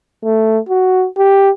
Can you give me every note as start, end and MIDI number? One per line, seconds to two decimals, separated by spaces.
0.25 0.59 57
0.69 1.07 66
1.17 1.50 67